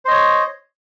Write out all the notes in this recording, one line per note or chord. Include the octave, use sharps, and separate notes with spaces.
C5 C#5 D#5